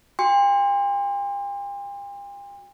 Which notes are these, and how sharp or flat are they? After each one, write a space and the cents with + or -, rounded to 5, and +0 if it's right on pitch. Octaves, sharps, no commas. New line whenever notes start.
F#4 -5 G5 +45 C6 +0